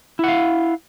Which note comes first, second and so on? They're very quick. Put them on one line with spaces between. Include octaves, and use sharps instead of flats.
E4 F#5 F5